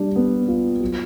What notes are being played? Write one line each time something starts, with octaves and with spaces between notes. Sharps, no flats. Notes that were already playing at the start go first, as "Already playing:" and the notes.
Already playing: G3 D4
B3
F4
F#3